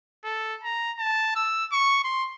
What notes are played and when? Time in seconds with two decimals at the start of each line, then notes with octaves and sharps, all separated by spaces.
0.24 A4
0.64 A#5
0.99 A5
1.36 E6
1.72 C#6
2.04 C6